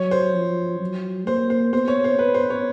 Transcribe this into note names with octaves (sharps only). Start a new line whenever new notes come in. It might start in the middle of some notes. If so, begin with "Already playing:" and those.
Already playing: F#3 C#5
C5
F3
F#3
A#3 C5
C5
B3 C5
C#5
C5
B3 B4
C5
C#5